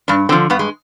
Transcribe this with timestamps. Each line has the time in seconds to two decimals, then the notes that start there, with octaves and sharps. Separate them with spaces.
0.08 G2 D4
0.29 D3 C4
0.32 F3
0.50 G2 B3
0.59 G#3